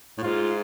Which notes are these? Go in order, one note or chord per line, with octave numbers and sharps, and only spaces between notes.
A2
G#2 F4